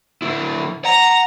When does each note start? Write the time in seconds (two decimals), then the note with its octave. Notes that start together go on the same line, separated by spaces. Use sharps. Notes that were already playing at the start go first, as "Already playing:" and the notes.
0.22 D3 E4
0.85 F#5 A#5